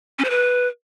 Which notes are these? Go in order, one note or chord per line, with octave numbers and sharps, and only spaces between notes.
C#4
C5
B4